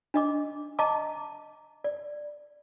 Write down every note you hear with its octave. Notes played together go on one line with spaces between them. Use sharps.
D4 D#5 D6
D#5 A5 A#5 D6
D5